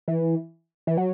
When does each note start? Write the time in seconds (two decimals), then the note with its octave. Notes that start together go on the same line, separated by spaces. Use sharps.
0.08 E3
0.87 E3
0.97 F#3